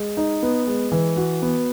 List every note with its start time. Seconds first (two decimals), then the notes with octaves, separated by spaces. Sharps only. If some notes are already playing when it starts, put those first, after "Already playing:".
Already playing: G#3
0.17 D#4
0.43 B3
0.67 G#3
0.92 E3
1.17 F#4
1.42 B3